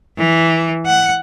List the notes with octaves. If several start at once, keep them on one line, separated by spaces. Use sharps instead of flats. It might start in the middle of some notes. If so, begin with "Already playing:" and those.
E3
F#5